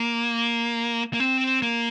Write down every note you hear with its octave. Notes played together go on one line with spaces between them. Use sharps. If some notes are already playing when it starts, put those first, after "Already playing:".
Already playing: A#3
A#3
C4
A#3